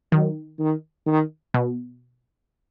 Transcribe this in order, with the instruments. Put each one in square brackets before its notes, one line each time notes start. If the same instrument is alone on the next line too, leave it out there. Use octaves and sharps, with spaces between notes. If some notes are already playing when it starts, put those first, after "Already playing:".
[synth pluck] D#3 [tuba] F#3
[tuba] D#3
D#3
[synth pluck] B2